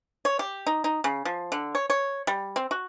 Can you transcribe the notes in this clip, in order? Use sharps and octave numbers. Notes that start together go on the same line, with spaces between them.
C#5
G4
D#4
D#4
C#3
F3
D3
C#5
C#5
G3
C4
F#4